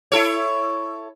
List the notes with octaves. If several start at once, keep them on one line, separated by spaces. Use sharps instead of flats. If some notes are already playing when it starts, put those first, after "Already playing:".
E4 A4 C#5